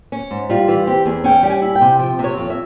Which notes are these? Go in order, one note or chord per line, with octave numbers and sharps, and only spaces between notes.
C#4
G#2
G3 F4
E3 F4
C4 G4
E2 G#4
C#4 G5
G3 G5
G#5
E4
G5
C3
F3 G5
C3
C#5
F2
E5